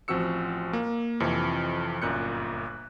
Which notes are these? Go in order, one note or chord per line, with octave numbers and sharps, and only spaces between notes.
A1 F3 C4 F#4 E6 C#7
A#3
F2 C3 E3 F3
G1 F#2 A#2 F#6 G6 C#7